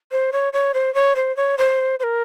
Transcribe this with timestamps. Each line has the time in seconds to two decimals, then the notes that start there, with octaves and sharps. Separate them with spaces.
0.12 C5
0.33 C#5
0.53 C#5
0.74 C5
0.95 C#5
1.16 C5
1.37 C#5
1.58 C5
2.00 C5
2.03 A#4